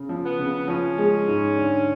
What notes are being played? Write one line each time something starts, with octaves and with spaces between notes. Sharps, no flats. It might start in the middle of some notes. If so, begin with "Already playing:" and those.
Already playing: C#3
F3
B3
C#3
F3 C#4
G#3
G#2
D3